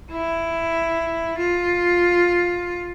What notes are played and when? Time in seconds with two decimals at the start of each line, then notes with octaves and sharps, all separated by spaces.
0.11 E4
1.38 F4